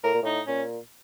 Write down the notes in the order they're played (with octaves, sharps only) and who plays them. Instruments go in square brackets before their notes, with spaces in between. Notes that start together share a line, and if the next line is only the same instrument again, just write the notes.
[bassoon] A2 [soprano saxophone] A#4
[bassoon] A#2
[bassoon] A2 [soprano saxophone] D#4
[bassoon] A#2 [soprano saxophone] C#4